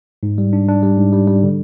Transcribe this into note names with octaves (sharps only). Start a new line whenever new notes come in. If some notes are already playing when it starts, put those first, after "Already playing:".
G#2
G3
D4
D4
G3
G#2
G3
G3
D3